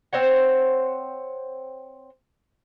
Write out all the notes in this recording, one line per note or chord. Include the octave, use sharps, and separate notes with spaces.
C4 C5 C#5 F#5